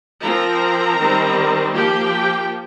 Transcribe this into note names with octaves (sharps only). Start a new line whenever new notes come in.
F3 C4 A#4 A#5
D#3 G3 C4
F3 A#3 G4 G5